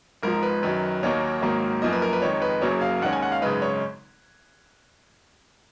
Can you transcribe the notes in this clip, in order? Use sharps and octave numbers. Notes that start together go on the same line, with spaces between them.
G#1 G#2 F3 A#4
B4
F#2 D#3 F#3 B4
D#2 D#3 F#3 A#3 D#4 C#5
G#1 G#2 D#3 F#3 A#3
F#2 F3 A#3 D#4 D#5
B4
A#4
B4
F2 D#3 G#3 D#4 C#5
B4
F#1 F#2 C#3 F#3 A#3 C#5
F5
D#2 D#3 G#3 C#4 F#5
G#5
F#5
F5
G#1 F#2 C#3 G#3 D#4 B4
C#5